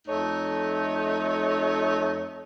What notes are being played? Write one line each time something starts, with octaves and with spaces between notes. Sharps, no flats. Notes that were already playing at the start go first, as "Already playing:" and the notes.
F2 A3 D#4 A4 C#5